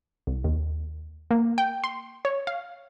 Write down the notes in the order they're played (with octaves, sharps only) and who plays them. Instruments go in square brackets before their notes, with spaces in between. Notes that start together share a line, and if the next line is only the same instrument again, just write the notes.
[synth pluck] C2
D#2
A#3
G5
C6
C#5
F5